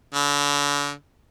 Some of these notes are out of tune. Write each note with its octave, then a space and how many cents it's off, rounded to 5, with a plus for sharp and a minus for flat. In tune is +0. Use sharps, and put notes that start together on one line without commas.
D3 -35